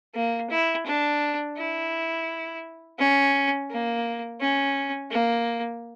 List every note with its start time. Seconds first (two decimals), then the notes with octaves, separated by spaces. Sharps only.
0.15 A#3
0.50 E4
0.86 D4
1.57 E4
2.99 C#4
3.70 A#3
4.41 C#4
5.11 A#3